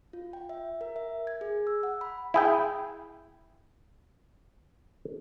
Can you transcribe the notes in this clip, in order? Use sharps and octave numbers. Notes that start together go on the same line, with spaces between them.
F4
G5
E5
A#4
E5
G#6
G#4
E6
F#5
B5
E4 G#4 G5